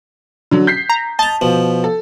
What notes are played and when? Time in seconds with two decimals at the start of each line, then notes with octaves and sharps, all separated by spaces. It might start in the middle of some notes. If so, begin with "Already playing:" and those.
0.51 D3 F#3
0.67 G6 B6 C7
0.89 A#5
1.19 D#5 A5 A#5
1.41 B2 F3
1.84 A4